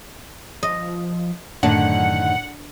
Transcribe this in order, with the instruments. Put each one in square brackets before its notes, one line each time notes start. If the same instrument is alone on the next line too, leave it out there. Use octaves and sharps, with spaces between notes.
[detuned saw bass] F3 [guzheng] D#5
[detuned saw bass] F#2 [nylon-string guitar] A2 D3 D#3 [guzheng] D4 [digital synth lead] F#5